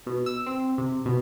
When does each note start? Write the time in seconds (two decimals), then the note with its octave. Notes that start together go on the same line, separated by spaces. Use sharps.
0.06 B2
0.26 E6
0.46 C4
0.78 C3
1.05 B2